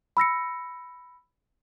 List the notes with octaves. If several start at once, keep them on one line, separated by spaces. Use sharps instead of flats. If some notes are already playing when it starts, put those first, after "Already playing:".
B5 E6 A#6 C#7